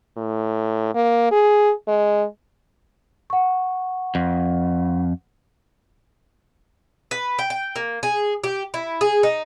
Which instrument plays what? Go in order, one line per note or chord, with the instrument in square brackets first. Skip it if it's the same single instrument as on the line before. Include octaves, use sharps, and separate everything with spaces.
[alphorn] A2
A#3
G#4
G#3
[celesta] F#5 C#6
[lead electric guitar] F2
[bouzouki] B4
G5
G5
A#3
G#4
G4
E4
G#4
D#4